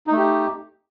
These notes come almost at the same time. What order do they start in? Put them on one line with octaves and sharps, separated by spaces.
D#4 A3 G4